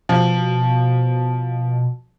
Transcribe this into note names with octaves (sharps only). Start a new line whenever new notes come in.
B2 F3